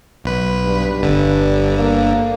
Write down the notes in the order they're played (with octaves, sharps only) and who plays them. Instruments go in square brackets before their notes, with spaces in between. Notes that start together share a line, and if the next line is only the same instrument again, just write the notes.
[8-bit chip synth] B1 B4
[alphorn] G2
[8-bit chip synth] G1 D3
[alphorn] A#3